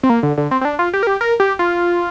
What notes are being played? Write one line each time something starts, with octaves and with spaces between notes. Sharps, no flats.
C4
A#3
D3
D3
C4
C4
D4
F4
G4
A#4
G4
A#4
G4
F4